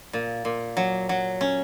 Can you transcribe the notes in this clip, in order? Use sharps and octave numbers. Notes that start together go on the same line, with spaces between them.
A#2
A#2
F#3
F#3
C#4